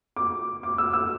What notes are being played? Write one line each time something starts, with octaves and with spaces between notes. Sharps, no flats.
D6
D6
E6
E6